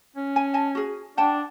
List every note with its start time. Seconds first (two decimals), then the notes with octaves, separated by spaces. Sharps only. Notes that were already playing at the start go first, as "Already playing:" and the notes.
0.16 C#4
0.36 G#5
0.54 D#5 G#5 A5
0.75 F#4 G#4
1.17 D4 F#5 G5 A5